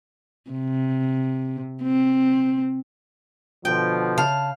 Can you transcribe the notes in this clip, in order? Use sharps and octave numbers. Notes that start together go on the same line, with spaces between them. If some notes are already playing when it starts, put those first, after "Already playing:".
C3
C4
B2 D3 F3 G5
C#3 F5 A5